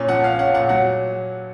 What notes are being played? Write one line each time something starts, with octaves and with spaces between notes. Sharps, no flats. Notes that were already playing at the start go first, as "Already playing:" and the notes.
Already playing: A#2 C#4
F3 F#5
C#4 F5
C#4 F#5
A#2 F#5
F#3 F#5